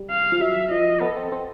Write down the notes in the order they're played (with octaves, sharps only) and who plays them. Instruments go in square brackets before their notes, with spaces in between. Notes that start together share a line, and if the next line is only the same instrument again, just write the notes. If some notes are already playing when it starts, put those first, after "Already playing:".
Already playing: [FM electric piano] G3
[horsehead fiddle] F5
[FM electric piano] F3
[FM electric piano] F#3 [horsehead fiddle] E5
[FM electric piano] F3 [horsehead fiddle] D#5
[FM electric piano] B3 [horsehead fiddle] A4
[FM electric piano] C4
C4